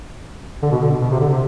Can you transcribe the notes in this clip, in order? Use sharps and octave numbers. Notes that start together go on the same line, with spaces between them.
D3
B2
D3
B2
B2
C3
D3
C3